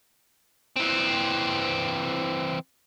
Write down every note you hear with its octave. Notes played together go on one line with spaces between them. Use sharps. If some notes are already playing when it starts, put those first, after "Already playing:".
E3 C4